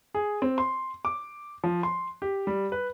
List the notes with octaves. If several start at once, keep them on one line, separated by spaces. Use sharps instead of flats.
G#4
C4
C6
D6
F3
C6
G4
G3
B4